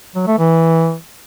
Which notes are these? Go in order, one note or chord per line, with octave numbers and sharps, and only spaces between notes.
F#3
A3
E3